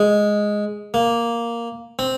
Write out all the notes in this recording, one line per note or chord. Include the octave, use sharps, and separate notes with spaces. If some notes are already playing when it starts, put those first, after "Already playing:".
Already playing: G#3
A#3
C4